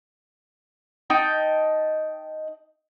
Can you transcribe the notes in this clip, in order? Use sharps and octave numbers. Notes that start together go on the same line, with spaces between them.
D#4 G5 A5